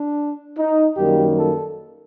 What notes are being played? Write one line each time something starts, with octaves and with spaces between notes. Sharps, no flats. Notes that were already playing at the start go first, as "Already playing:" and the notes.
Already playing: D4
D#4
F#2 D#3 G3 A#3 G4
A4